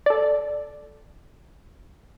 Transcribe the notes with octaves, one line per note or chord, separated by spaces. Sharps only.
A4 D5